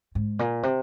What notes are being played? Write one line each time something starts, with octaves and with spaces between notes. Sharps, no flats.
G#2
A#2
C3